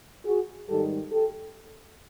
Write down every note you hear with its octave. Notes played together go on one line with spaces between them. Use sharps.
F#4 G#4
G#2 D#3 G3 G4 A4
G4 A4